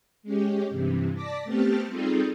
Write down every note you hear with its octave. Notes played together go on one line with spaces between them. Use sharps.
G#3 C#4 G4
G2 C3 E3
D5 A5 D6 A#6 B6
A3 B3 C4 G4 A5 F6
G3 C4 D#4 F4 G#4 A4